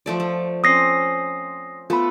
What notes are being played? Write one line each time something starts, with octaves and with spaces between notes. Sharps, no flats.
F3 A3 D5
A3
C4 C#4 D#6 A#6 C7
A3 B3 F4 A4 B5